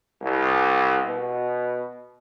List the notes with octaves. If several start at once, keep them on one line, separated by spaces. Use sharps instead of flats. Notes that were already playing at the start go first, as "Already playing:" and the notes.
C2
B2